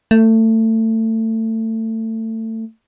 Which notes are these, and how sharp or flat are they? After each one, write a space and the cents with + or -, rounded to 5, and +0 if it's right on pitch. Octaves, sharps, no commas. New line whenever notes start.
A3 +25